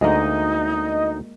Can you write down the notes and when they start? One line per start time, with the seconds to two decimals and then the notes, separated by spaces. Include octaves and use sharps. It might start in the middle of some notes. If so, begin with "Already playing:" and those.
0.01 D2 G#3 A#3 D#4 D#5